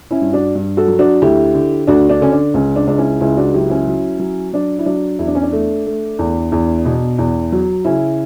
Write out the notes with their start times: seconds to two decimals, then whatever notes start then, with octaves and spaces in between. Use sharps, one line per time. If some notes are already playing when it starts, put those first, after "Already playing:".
0.11 C#4 E4
0.22 G2
0.33 D4 F#4
0.55 G2
0.77 F#4 A4
0.88 F#3
0.99 D4 F#4
1.22 D2 E4 G4
1.54 D3
1.87 D2 D4 F#4
2.09 D4 F#4
2.21 D3 C#4
2.32 D4
2.54 C#2 C#4
2.76 D4
2.87 C#2 D4
2.98 C#4 E4
3.21 C#2 C#4 E4
3.37 D4 F#4
3.54 F#3 E4 G4
3.70 C#4 E4
3.87 F#3
4.19 F#3
4.53 F#3 D4
4.79 E4
4.86 F#3 D4
5.19 E2 E4
5.27 D4
5.35 C#4
5.42 D4
5.52 A3
5.86 A3
6.19 E2
6.52 E2
6.85 B2
7.19 E2
7.52 F#3
7.85 C#3 C#4 E4